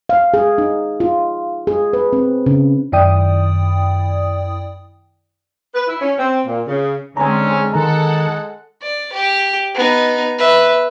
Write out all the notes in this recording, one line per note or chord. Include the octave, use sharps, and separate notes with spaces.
F5
G#4
D#4
F4
G#4
B4
C4
C#3
F#2 D#3 E4 D5 G5 D#6
B4
E4
C#4
C4
A#2
C#3
D3 G#3 C4 C#4 G#5 A#5
D#3 G#3 A4 F#5 A#5
D5
G4
B3 D#4
B4 E5